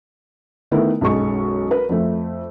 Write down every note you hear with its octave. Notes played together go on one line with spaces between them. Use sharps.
D#3 A3 B3 E4 A#4
B1 F#2 G#3 C#6
A#4 B4
F2 A3